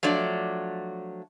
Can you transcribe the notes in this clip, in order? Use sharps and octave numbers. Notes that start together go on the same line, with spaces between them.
F3 F#3 A3 D4 D5